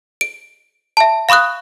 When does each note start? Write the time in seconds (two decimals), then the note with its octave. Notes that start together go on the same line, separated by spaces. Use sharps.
0.21 D7
0.97 E5 A5
1.29 F5 B5 C#6 D#6 F#6